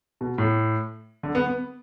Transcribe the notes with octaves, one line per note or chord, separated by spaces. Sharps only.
B2
A2
D3
B3
B3